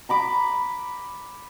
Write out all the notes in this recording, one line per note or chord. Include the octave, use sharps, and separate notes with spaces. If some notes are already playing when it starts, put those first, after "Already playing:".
A#5 B5 D6